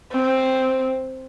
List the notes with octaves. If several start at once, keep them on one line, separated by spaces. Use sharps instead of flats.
C4